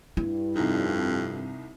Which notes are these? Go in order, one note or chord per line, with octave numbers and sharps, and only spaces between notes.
G2 E4
C2 F2 D#4